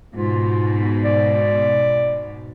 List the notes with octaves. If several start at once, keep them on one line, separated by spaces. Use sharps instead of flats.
G#2 B2 F4
D5